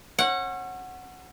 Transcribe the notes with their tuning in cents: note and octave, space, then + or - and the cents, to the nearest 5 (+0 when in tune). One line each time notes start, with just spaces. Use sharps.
C#4 -35 F#5 -5